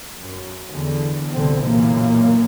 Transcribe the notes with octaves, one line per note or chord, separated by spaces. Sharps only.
F#2
E2 D3
C2 B2 D3 E3 C4
B1 F#2 A#2 E3 A#3